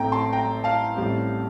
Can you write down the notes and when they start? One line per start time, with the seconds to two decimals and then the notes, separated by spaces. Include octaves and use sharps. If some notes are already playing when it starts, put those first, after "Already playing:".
Already playing: A1 A2 A3 C4 G5 A#5
0.12 A5 C6
0.33 G5 A#5
0.64 F5 A5
0.96 A1 A2 G3 C4